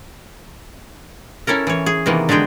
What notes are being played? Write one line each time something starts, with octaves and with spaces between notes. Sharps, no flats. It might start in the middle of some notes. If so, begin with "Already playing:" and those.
C#4 E4 A4 A#4
E3 C#5
G#4
C3 D#3 E3 A#3 B3
D3 G#3 F#4 G#4 G5